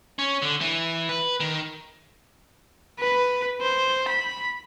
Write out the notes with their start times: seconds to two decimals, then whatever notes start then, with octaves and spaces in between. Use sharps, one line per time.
0.19 C#4
0.42 D3
0.61 E3
1.09 B4
1.40 D#3
2.99 B4
3.61 C5
4.08 B5